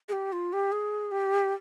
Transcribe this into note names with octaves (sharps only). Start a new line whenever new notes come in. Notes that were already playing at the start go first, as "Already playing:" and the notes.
G#4
G4
F4
G4
G#4
G4